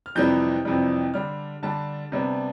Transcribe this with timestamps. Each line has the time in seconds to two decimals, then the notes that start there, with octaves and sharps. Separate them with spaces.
0.06 F6
0.15 F2 C3 E3 G3 D4 G6
0.65 F2 C3 E3 G3 D4
1.14 D3 G3 D4 F6
1.62 D3 G3 D4 A5
2.12 C3 G3 B3 D4